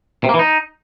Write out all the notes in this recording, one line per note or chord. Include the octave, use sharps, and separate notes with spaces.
C3
A#3
E3
D#4